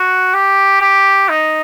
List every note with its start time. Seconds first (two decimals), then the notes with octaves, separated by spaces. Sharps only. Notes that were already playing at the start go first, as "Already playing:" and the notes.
Already playing: F#4
0.34 G4
0.81 G4
1.29 D#4